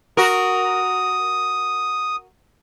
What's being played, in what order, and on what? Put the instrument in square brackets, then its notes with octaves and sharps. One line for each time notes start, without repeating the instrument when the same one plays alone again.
[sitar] F#4 A#4 [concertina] D#6